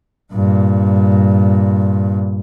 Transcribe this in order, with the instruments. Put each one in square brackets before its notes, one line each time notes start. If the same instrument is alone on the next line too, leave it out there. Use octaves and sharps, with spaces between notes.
[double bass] G2 A#2